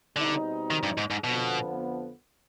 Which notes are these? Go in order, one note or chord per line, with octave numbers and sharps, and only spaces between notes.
B2 D3 G3 C4 D#4
D#3
G2
G#2
G#2
F2 B2 D3 F3 B3